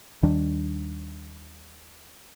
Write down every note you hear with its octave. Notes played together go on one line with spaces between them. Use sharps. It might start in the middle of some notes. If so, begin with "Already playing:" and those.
D#2 D#3 G3 D4